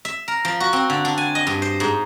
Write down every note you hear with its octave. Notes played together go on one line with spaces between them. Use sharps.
E5
A#4
F3
F#4
C4
D3
D4
G#5
D#5
G2
C5
G#2